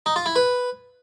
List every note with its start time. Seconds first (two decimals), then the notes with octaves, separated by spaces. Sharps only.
0.06 D#4
0.16 F4
0.26 E4
0.36 B4